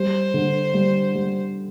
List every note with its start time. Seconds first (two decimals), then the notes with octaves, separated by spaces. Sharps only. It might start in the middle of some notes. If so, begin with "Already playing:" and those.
Already playing: G3 C5
0.34 D3
0.74 G3
1.15 G3